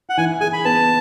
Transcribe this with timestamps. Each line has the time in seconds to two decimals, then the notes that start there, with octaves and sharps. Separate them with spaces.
0.10 F#5
0.17 E3 G#5
0.41 G#4 G#5
0.53 B5
0.65 B3 A5